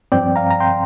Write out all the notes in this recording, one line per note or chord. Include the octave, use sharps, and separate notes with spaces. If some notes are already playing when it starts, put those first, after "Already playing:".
G2 F3 C4 D5 G5
F5 A#5
A#5
G5 C6